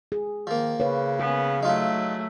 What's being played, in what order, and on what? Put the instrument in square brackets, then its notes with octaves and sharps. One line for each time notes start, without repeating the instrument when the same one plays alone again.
[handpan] G#4
[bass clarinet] D#3 [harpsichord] F3 A#3
[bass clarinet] C#3 [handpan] B4 C#5
[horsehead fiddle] B3 C#4 [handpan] G#4
[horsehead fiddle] F#3 A3 [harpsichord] D#4 F4